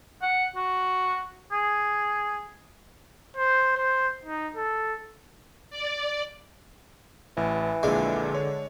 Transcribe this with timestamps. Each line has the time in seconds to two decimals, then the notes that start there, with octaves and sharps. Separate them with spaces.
0.22 F#5
0.56 F#4
1.51 G#4
3.37 C5
3.77 C5
4.25 D#4
4.56 A4
5.70 D5
7.37 A1 E3
7.83 A#1 A#2 D3 G#3
8.35 C#5